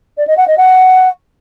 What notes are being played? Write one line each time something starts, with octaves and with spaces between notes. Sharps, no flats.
D5
D#5
F#5
D#5
F#5